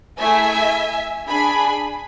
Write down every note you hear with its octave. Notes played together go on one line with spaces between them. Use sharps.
A3 E4 G#4 E5 G#5
D4 G#4 G#5 B5